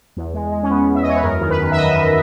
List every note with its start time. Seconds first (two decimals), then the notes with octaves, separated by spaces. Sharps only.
0.17 E2
0.34 G#3
0.52 G#3
0.63 C#4
0.69 E2 B3
0.88 E2
0.95 E5
1.02 D#5
1.05 E2 C#5
1.16 B4
1.23 F#2 A#4
1.41 D#3
1.50 B4
1.59 F#2
1.72 E5
1.77 F#2 D#5
1.95 F#2